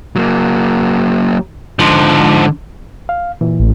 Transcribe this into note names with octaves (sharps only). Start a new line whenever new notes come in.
F#3 A#3
G#2 D3 F3 C6
F5
A#2 E3
A1